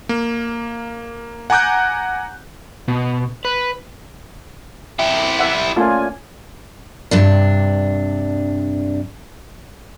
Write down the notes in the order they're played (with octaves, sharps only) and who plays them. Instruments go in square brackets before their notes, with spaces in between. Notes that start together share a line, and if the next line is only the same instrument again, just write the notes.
[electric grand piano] A#3
F#5 G#5 A#5 D6 F#6 G6
[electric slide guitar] B2
B4
[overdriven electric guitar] E4 G4
[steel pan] E5 F#5
[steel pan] A3 A#3 F4 [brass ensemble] C#4 D5 G#5
[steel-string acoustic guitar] G2 C3 D4